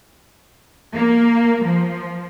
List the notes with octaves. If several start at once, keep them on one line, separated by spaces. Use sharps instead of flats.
A#3
F3